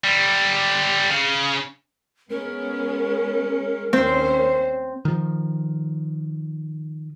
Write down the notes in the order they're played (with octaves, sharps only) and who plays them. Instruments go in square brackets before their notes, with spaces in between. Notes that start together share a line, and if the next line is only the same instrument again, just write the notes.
[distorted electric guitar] D3 G3
C#3
[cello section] G#3 B3 C#4 [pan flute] A#4
[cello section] D#2 C#4 C5 [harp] C4
[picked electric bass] D#3 F3